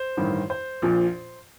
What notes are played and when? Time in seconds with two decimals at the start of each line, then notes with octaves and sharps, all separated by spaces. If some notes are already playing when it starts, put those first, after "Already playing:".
Already playing: C5
0.17 A1 G2 D#3
0.50 C5
0.82 A#1 A#2 F3